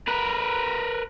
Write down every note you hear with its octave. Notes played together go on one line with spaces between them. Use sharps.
A#4 B4